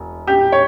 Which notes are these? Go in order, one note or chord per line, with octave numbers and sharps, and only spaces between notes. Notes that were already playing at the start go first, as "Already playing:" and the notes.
Already playing: E1
G4
C#5